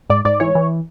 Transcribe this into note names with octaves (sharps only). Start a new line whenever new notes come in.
G#2 D5
G#2 D5
E3 C#5
E3